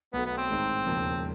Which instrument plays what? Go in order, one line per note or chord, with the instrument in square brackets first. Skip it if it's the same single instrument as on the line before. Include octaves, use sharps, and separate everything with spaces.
[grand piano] B1 B2 F#3 A3 [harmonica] B3
[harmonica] B3
C4
[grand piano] A1 G#2 D#3 G#3
E1 D#2 C#3 F3 A#3